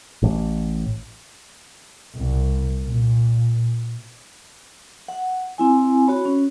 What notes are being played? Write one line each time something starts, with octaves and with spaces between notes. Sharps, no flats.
A1
C2
A#2
F#5
C4 E4 G#5
F#4 C#5 B5
C#4